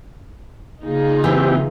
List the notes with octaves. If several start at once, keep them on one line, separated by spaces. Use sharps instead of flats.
C#3 A#3 D#4 F4 G#4
E3 C4 G4